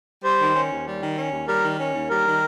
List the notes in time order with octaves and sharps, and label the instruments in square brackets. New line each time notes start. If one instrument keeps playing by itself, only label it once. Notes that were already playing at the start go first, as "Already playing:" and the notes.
[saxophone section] G3 [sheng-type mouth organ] C5
[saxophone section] D#3
C#4
D#2
G3
D#3
C#4
D#2
[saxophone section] G3 [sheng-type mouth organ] A#4
[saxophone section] D#3
C#4
D#2
[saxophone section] G3 [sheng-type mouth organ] A#4
[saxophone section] D#3